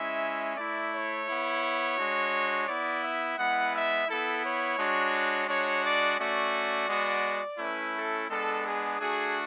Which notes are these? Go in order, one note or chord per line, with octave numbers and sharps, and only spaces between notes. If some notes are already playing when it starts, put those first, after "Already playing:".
Already playing: G#3 C#4 E4 E5
A3 E4 D5
C#5
B3 E4
G#3 D4 F#4
B3 E4 D5
E5
G#3 B3 E4 F#5
E5
B3 E4 A4
C#5
G#3 D4 F#4
G#3 D4 F#4 C#5
D5
A3 C#4 F#4 D5
G#3 B3 F#4
A3 C#4 E4 B4
A4
G#3 B3 D4 A4
G#4
A3 D4 F#4 G#4